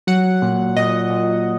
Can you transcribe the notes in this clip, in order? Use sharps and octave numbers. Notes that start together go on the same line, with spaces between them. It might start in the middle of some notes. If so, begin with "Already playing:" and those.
F#3 F#5
A#2
A#2 D#5
A#2